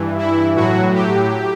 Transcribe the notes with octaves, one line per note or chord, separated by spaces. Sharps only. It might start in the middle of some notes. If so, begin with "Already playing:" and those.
Already playing: G2 E3
E4
A2 F#3 F#4
G4